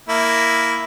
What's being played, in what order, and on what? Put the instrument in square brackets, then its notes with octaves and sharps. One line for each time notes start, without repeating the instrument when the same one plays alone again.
[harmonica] A#3 E4